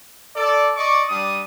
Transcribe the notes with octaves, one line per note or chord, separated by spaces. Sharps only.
A4 D5
D5 D#5 C#6 D6
G3 D4 D#6